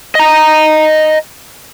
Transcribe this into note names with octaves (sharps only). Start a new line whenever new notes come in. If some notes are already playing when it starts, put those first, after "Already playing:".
D#5 A#5